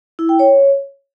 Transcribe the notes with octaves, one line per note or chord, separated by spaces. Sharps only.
E4
G5
C#5